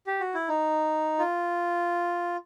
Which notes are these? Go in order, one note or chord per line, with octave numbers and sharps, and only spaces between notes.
G4
F#4
E4
D#4
F4